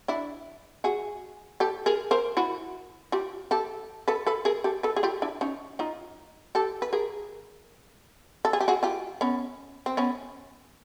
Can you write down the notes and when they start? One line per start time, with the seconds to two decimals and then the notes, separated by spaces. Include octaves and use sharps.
0.08 D4 E4
0.84 F#4 G#4
1.60 G4 A4
1.86 G#4 A#4
2.11 A#4 C5
2.37 E4 F#4
3.12 F4 G4
3.51 G4 A4
4.08 A4 B4
4.27 A4 B4
4.45 G#4 A#4
4.64 G4 A4
4.83 A4 B4
4.96 G#4
5.03 F4 G4
5.22 D4 E4
5.41 C#4 D#4
5.79 D#4 F4
6.55 G4 A4
6.82 B4
6.93 G#4 A#4
8.45 A4
8.53 G#4
8.61 G4
8.68 F#4 G#4
8.83 F4 G4
9.21 B3 C#4
9.86 C4
9.97 B3 C#4